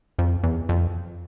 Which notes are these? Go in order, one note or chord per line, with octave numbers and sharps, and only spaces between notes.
F2
E2
F2